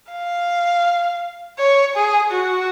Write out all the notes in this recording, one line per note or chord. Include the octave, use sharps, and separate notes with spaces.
F5
C#5
G#4
F#4